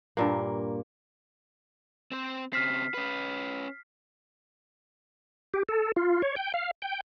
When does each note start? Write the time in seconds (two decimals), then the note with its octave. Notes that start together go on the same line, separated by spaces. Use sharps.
0.17 G2 A#2 A#3
2.12 C4 C5
2.53 C#3 C4 F6 B6 C7
2.94 C#4 B4
5.54 G4
5.69 A4
5.96 F4
6.22 C#5
6.36 G5
6.54 F5
6.82 G5